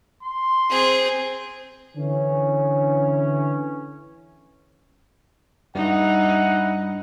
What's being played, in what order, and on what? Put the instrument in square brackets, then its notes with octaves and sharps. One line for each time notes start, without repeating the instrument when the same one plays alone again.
[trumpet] C6
[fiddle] C4 G#4
[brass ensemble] D3 E3 C#4
[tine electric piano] G2 [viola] D#4 [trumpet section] E4 F#5